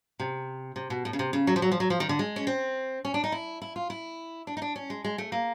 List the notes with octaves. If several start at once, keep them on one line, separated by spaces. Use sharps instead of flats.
C3
C3
B2
A2
C#3
C3
C#3
F#3
F3
F#3
F3
F#3
F3
D#3
D3
G#3
C#4
C4
C#4
D4
D#4
E4
E4
F4
E4
D4
D#4
D4
C#4
G#3
G#3
A3
A#3